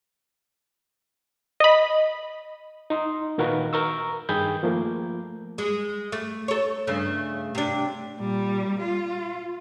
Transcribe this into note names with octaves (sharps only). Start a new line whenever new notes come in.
D#5 B5
D#4 C6
A#2 D#3 F#4 A#4 B4 F5
A#4 A#5 C#6 E6
G2 D#3 G#4 G5 B5 G6
F3 A3 A#3
G#3
A3
A4 C#5
G2 C#3 A3
C3 D4
A#2 G3
F4